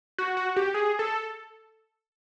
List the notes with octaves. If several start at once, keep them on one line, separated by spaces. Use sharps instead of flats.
F#4
F#4
G4
G#4
A4